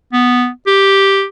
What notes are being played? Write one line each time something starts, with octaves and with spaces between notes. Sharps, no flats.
B3
G4